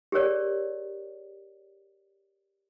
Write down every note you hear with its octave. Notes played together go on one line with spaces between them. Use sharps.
G4 G#4 A#4 C#5 D5